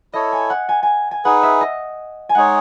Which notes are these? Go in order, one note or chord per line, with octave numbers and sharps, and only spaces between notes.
E4 A4 C#5 D#5
G#5
F#5
G#5
G#5
G#5
D#4 G#4 B4 F#5
E5
D#5
G#5
G#3 D#4 G#4 C#5 F#5